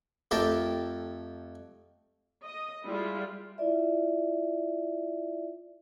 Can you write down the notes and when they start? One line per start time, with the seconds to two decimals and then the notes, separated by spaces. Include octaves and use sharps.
0.31 F2 A3 G4 A#4 G5 A5
2.44 D#5
2.85 G3 G#3 E4 F4
3.58 E4 F4 D5 E5